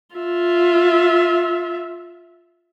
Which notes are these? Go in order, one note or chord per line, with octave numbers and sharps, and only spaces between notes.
F4 E5